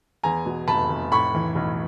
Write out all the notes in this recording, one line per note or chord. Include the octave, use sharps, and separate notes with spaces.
E2 G#5 A#5
B2
F1 A5 B5
F1
A2 B5 C#6
E3
B1